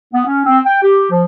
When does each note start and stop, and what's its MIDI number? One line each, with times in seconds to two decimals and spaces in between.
0.13 0.22 59
0.26 0.43 61
0.46 0.60 60
0.66 0.79 79
0.82 1.09 67
1.11 1.24 53